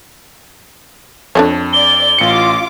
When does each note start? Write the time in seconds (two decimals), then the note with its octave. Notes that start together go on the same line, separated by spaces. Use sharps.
1.35 F2 D4 A4 C#5
1.73 D5 G7
2.18 A1 F4 D6 C#7